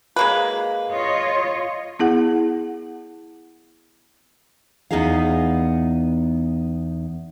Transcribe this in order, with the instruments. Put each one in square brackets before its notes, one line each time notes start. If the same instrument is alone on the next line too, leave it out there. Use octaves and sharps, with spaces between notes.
[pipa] G#3 A#3 B4
[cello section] F4 C#5 D#5
[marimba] B3 E4 G#4 F#5
[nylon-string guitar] E2 B3 D#4 E4 G#4 F5